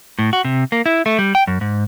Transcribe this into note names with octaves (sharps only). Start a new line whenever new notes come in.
A2
F#4
C3
A#3
E4
A3
G3
G5
F#2
G#2